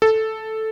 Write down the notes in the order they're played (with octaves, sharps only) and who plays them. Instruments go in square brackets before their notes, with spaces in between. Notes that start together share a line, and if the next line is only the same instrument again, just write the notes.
[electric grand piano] A4